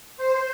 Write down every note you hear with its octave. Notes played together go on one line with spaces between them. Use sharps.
C5